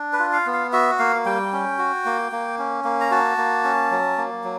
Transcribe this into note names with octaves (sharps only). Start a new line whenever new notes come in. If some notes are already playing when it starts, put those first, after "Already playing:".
Already playing: D4
B4
F4
F5
B3
F5
F#4 E5
A#3 F5
G3 G5
C#4
F#4
A#3
A#3
C#4
A#3
A#5
F#4 A5
A#3
C#4
F#3
A#3
F#3